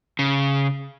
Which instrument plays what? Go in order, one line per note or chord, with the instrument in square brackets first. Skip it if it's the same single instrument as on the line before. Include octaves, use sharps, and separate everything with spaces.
[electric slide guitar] C#3